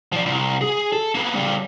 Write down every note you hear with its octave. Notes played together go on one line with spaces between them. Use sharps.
F3 D5
C2
G#4
A4
A#3 B3
C#3 G3